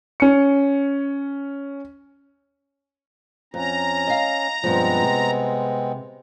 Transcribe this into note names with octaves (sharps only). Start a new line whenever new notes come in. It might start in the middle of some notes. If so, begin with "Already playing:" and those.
C#4 C#7
F2 C#4 A#5
D#5 F5
G2 B2 F3 G#3 B3 C4
C3